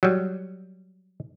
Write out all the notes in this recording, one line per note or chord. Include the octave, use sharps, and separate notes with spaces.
F#3 G3